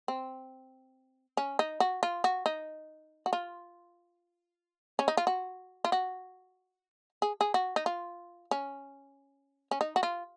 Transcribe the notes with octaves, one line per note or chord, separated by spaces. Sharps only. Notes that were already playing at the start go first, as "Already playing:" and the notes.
C4
C#4
D#4
F#4
F4
F#4
D#4
F#4
F4
C#4
D#4
F4
F#4
F4
F#4
G#4
G#4
F#4
D#4
F4
C#4
C#4
D#4
F#4
F4